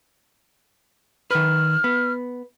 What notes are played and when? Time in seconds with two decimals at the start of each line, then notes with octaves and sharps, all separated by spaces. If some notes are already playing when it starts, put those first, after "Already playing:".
1.31 D#3 B4 F6
1.84 B3